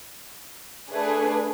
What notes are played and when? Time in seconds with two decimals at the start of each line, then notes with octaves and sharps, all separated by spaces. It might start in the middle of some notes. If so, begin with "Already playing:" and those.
0.89 A3 D4 G#4 B4